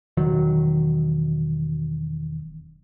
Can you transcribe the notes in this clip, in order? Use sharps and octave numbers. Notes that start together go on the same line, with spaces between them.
E1 D#3 F#3